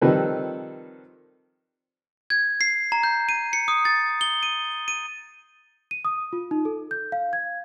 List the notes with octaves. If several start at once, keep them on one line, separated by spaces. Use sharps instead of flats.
D#3 F3 G3 C4 A4 B4
G#6
C7
A#5
G6
D#7
C#7
D#6
A6
G7
D#7
D#7
D#7
D#6
F4
D#4
A4
G6
F5
G#6